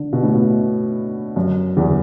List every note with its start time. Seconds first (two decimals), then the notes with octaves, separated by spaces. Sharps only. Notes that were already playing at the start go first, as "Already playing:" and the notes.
Already playing: D3
0.13 B2
0.23 A2
0.35 B2
1.36 F#2
1.77 E2